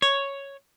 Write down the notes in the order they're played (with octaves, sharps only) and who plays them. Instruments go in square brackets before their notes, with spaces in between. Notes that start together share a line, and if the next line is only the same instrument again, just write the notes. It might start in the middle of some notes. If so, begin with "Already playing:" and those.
[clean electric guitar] C#5